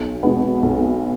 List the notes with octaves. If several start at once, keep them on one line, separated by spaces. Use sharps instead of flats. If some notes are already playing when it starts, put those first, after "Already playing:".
Already playing: B1
B2 G#3 B3
B1